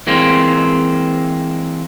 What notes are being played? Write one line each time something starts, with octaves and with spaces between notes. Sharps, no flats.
E3 G#3 A#3 C4